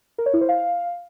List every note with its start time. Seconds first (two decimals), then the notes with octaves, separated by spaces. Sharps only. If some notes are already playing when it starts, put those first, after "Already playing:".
0.18 A#4
0.26 C#5
0.34 E4
0.41 C5
0.49 F5